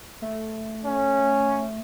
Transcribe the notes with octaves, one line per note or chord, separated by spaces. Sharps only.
A3
C#4